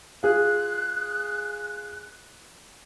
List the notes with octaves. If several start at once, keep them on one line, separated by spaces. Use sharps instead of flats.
F4 G#4 F5 F#6